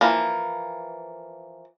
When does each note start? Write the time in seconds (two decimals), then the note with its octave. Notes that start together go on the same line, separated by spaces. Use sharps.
0.01 E3 F3 A#3